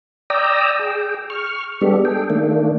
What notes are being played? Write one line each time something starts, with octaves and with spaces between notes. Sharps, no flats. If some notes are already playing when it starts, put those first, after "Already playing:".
D5 G5 A#5 D#6 E6
G#4 G5
C#6 F6
G3 G#3 B3 D4 G4 A4
G#4 A4 G5
D#3 A3 A#3 D4